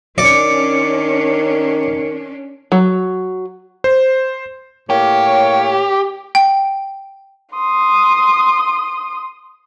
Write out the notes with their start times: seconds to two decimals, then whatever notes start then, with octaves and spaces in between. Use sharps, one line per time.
0.18 D#3 C#4 D4 D5 C#7
2.72 F#3
3.84 C5
4.90 A2 A#3 G4 C#5
6.35 G5
7.56 C6 D#6